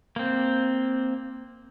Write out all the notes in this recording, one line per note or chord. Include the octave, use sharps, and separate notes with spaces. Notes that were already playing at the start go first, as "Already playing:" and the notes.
A#3 C4